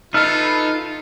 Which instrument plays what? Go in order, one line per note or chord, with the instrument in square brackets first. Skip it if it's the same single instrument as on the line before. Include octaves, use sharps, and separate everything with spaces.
[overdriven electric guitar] D#4 [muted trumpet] F4 [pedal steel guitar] A4 B4 E5 [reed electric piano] F6